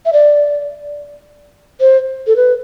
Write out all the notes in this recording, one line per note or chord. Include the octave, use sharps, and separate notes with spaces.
E5
D5
C5
A4
B4